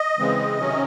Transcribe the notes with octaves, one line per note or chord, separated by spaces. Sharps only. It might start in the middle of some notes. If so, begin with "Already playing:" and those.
Already playing: D#5
C#3 E3 G#3 C4
C3 D#3 F#3 C#4